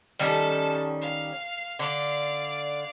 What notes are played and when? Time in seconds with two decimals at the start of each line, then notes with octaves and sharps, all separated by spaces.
0.19 D#3 G3 C#4 A4 A5
1.00 F5
1.79 D3 D5 F5